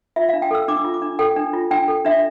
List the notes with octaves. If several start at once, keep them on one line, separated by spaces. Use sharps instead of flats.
F4 E5
D4 F5
G5
A4 E6
D4 D6
F4
D6
D4
A4 G5
D4
F4
D4 G5
A4
D4 E5